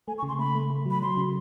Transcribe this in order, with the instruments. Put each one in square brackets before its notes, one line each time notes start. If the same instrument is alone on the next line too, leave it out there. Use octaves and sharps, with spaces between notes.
[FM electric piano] A3 [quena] G#5
[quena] C#6
[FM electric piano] C#3
[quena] C6
[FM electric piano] A3 [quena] B5
[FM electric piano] A3
A3
F#3
[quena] B5
[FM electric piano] F#3 [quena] C6
[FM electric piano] C#3